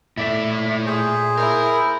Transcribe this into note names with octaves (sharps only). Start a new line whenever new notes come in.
A#2 A3 E4 D5 E5
G#4 C5
E4 A#4